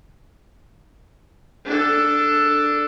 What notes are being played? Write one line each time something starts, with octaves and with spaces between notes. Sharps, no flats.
D4 A4